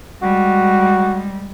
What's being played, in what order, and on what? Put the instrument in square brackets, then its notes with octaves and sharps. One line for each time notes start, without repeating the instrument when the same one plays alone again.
[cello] G3 G#3 [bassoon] F#4